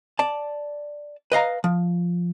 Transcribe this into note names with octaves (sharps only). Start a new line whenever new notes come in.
D5 A5
B4 D#5 F5 A#5
F3